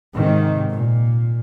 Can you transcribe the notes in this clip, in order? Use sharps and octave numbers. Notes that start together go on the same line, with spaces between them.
G#2 C3 D#3
A#2